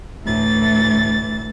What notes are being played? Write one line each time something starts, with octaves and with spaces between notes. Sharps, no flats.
D2 A2 E3 A6